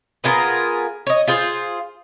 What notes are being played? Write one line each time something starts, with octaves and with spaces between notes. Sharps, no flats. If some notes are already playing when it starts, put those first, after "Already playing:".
B3 F4 G#4 A#4
C#5 D#5
F4 G#4 C5